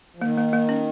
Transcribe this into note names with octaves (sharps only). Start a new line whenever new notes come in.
F3
D#3 A#3
A#3
A#3
C#4